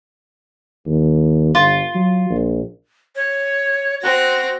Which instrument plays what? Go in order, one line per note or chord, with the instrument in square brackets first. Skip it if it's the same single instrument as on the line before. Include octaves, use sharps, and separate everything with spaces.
[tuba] D#2
[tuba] G1 [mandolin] F4
[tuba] F#3
A#1
[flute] C#5
[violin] C4 A#6 [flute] F#4